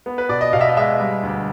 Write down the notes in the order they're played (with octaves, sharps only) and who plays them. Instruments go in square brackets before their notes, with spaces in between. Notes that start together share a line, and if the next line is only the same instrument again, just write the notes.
[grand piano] B3
B4
B2 D5
D#5
B2 F5
E5
D#5
G#3 E5
G3
D2